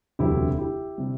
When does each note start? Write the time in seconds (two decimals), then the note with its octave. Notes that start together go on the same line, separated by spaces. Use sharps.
0.19 E1 D2 C3 F#3 E4 G4
0.58 E4 G4
0.98 C3 G3